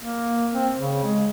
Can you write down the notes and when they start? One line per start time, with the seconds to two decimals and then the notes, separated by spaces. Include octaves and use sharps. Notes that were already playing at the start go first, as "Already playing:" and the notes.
0.01 A#3
0.53 C4
0.77 C#3
1.04 G#3